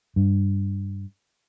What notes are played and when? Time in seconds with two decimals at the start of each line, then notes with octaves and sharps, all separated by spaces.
0.16 G2